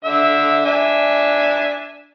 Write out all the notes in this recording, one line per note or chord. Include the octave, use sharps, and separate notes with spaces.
D3 E5 E6
D4 E5 G#5